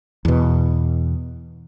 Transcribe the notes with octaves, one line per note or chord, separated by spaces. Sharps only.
E2 B2